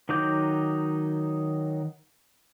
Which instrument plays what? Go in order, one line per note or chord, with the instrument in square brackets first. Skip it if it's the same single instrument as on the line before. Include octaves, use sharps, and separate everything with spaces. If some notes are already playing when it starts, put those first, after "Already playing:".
[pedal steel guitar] D#3 F#3 D#4 D6 G6